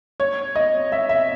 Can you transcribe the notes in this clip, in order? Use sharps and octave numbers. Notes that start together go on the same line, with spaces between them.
C#5
D#5
E5
E5